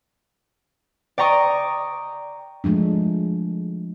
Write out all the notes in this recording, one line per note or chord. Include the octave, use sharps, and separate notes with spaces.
D5 G5 A#5 C#6 D#6
F3 G#3 A3 D4